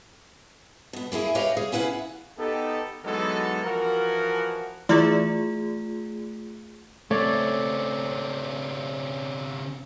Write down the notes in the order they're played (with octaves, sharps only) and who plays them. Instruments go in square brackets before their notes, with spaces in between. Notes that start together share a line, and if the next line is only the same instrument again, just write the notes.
[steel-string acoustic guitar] B2 B3
A#3 C#4 E4 G#4
G4 B4 C#5 D#5 F5
G#4 F5
C#4 E4 B4 F5 F#5
[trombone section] B3 D#4 G4 A4
E3 F#3 G#3 B3 D#4 A4
E3 F3 F#4 A#4
[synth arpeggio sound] E3 E4 D5 [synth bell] A3 F4 G#4
[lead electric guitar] C#3 C4 [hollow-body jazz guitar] A3 [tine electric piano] C#5 D5